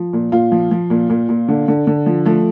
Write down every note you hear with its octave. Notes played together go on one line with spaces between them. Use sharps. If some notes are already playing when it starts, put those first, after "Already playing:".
Already playing: F3
A#2
A#2 F4
F3
F3
A#2
A#2
A#2
D3
D3
D3
F3
F3 A3